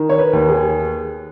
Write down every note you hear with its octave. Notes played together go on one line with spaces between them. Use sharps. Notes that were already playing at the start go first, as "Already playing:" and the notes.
Already playing: D#3
C#5
B4
D#2
G#4